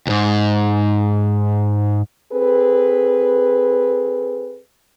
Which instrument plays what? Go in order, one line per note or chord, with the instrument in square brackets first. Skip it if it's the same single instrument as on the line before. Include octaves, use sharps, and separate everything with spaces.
[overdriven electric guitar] D#2 G#2
[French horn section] C4 G#4 A4 B4